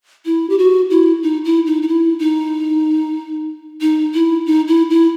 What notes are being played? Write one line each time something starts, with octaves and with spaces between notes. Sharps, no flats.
E4
G4
F#4
E4
D#4
E4
D#4
D#4
E4
D#4
D#4
E4
D#4
E4
E4